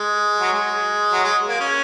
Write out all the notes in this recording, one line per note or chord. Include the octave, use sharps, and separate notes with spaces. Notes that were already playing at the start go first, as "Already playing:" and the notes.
Already playing: G#3
F#3
G#3
F#3
G#3
A#3
C#4